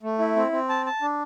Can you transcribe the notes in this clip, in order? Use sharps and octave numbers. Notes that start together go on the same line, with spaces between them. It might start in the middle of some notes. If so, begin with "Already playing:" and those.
A3
E4
C4
C4
A5
A5
D4